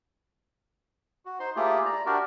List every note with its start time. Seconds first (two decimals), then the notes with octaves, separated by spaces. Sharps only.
1.25 F#4
1.40 D#4 C5 C6
1.56 A3 A#3 E4 F4 G4 G#4
1.85 D5 A#5
2.06 D4 F#4 G4 A#4 D5